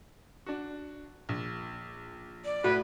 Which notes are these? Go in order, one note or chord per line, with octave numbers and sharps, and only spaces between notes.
D4 F#4
A#1
D5
A2 F#4 B4